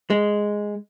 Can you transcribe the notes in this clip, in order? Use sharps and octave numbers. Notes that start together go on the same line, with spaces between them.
G#3